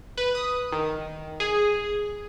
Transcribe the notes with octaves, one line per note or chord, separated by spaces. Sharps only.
B4
D#6
D#3
G#4